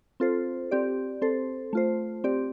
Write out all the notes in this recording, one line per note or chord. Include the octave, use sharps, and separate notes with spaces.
C4 F4 A4 C5
C4 G4 D5
C4 A4 C5
A3 F4 C5
C4 G4 D5